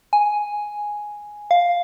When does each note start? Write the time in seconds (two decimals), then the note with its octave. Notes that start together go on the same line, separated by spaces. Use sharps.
0.13 G#5
1.51 F5